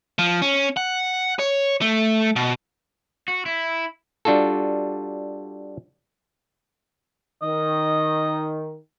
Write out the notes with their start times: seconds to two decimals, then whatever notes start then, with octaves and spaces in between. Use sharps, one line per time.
0.19 F3
0.42 C#4
0.77 F#5
1.39 C#5
1.81 A3
2.36 B2
3.28 F#4
3.46 E4
4.25 G3 D4 F4 F#4 A4
7.42 D#3 D#5